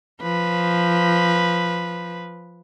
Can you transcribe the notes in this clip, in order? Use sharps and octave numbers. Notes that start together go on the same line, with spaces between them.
F3 B4